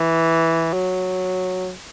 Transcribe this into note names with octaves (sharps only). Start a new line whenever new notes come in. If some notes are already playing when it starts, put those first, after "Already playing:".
Already playing: E3
F#3